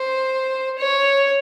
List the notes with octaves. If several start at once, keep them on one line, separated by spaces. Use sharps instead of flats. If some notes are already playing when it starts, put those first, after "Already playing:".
Already playing: C5
C#5